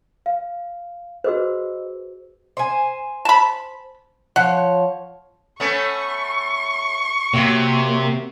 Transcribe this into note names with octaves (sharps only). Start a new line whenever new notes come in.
F5
F#4 G#4 B4 C5 D#5 E6
C5 G#5
A5 B5
F3 C#5 F#5
A3 B3 C#4 C#6
C3 F#3 A#3